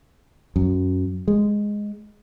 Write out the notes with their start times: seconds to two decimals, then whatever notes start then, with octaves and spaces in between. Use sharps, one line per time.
0.56 F#2
1.28 G#3